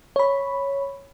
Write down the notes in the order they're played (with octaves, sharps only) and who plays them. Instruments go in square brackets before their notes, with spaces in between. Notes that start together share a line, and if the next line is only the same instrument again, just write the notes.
[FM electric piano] C#5 B5